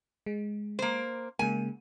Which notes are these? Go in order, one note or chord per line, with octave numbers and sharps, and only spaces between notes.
G#3
A#3 C5
C#3 G#3 A#3 G#5